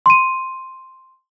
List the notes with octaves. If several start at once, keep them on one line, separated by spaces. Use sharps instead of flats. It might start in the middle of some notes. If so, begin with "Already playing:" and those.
C6 D#7